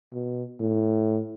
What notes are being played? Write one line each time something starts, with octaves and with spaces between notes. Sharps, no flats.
B2
A2